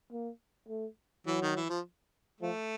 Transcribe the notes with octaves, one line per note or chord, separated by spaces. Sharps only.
A#3
A3
E3 F#3
D#3
E3
F3
F3 A3